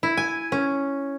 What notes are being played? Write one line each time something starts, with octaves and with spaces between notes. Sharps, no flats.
E4
G#5
C#4